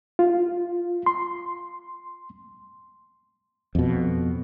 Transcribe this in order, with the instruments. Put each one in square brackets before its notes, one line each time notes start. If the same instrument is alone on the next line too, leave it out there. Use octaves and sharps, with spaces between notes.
[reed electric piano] F4
C6
[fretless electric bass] F2 B2